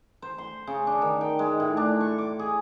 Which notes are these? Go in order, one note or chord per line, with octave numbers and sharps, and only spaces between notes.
C5
C6
C#3
D4
D#3
G5
G#3
A2
D4
C#6
D6
G#4